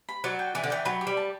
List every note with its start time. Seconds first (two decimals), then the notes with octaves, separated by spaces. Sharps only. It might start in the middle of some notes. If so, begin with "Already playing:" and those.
0.09 B5
0.24 F#3 D5
0.39 G5
0.55 E3 D5
0.64 D3
0.70 E3 G5
0.85 F#3 B4
1.01 G4
1.07 G3
1.17 A5